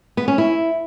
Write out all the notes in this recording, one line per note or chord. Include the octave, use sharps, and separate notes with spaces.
B3
C#4
E4